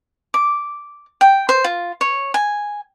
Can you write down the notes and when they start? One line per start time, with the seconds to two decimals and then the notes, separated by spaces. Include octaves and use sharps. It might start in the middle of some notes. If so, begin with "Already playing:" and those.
0.34 D6
1.21 G5
1.49 C5
1.64 F4
2.01 C#5
2.34 G#5